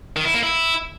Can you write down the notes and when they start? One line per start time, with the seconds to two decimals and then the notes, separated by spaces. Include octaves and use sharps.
0.16 D#3
0.25 E4
0.34 A#3
0.43 E4